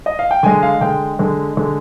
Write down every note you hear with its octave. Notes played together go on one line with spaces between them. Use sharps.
D#5
F5
G5
D3 G#3 G#5
F5
D3 G#3 G5
D3 G#3
D3 G#3